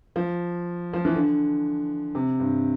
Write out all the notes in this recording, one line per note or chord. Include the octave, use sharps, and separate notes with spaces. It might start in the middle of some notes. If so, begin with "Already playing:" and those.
F3
F3
E3
D3
C3
G2